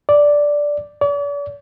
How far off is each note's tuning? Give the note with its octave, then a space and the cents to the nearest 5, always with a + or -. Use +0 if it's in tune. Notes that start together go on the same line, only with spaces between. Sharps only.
D5 -5
D5 -45